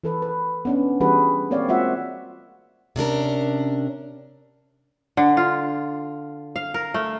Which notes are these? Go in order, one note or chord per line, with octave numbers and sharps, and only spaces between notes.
E3 A4 B4
B4
B3 C#4 D4
E3 G3 F#4 G#4 B4
A#3 C4 C#5 D5 F5
G#3 F4 F#4 E5 F#5
C3 C#4 D4 A#4
D3
F4
F5
A#4
A3